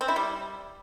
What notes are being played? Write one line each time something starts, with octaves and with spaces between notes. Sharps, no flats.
C4
E4
G3